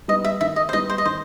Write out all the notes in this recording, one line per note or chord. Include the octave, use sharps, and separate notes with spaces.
G3 B3 D#4 D#5
E5
D#3 E5
D#5
C5
G3 B3 D#4 D#5
C5
D#5
D#3 C5